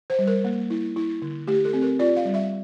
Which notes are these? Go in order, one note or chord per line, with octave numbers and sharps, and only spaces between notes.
C5
G3
A#4
A#3
E4
E4
D3
A3 G4
A4
C4
A#4
F4 D5
F5
G3
E5